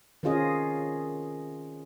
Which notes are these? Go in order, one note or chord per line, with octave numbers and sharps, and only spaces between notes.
D#3 C4 C#4 F4 G#4 D#5